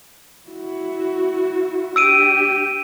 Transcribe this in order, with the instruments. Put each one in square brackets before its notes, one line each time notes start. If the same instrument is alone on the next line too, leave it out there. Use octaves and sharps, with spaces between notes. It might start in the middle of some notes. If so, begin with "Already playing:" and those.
[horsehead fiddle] E4 F#4
[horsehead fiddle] D4 G4 [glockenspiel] E6 D7 D#7